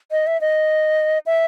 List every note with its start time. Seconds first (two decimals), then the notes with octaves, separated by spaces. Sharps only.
0.11 D#5
0.27 E5
0.41 D#5
1.26 E5